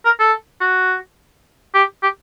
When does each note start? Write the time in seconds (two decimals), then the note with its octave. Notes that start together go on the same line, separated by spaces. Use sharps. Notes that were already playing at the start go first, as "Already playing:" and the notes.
0.05 A#4
0.19 A4
0.61 F#4
1.74 G4
2.03 G4